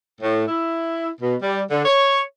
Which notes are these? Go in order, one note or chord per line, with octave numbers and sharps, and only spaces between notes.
A2
E4
B2
G3
D3
C#5